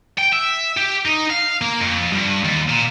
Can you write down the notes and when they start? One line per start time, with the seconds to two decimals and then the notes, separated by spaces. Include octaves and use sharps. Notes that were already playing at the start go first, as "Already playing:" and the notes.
0.18 G5
0.33 E5
0.77 G4
1.05 D#4
1.30 F5
1.61 A#3
1.81 F2
2.13 G2
2.45 D#2
2.69 A#2